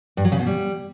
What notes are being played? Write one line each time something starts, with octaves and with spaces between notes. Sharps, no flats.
G2
F#3
C#3
B2
G3